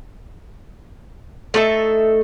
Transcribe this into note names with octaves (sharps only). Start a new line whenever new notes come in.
A3 D#4 A4 E5